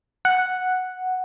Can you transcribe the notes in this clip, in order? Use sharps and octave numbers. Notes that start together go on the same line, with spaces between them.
F#5